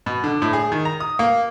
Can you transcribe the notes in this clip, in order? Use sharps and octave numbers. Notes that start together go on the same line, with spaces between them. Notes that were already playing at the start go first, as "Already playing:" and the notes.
B2
D3
A2
G#4
D#3
A#5
D#6
A#3